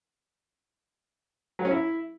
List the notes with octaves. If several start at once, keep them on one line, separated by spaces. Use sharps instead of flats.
F#3
C#4
E4